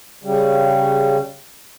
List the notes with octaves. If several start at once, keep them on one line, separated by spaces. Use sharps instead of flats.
C#3 G3